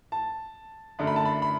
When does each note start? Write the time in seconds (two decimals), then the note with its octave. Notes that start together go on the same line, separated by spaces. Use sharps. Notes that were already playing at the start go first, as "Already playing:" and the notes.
0.12 A5
0.99 F#2 D3 A3
1.07 B5
1.16 A5
1.25 B5
1.42 B5